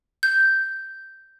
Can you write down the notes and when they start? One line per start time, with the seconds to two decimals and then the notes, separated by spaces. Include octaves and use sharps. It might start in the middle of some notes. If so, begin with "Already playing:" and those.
0.23 G6